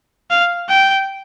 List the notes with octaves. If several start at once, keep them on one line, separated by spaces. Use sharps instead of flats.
F5
G5